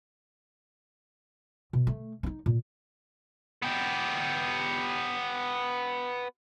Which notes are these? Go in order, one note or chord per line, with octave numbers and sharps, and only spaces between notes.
B2
A3
C#4 D#4
A#2
B3 G4